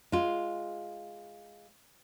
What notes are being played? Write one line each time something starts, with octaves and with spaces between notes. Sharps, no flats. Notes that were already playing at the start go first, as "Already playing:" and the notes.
G#3 F4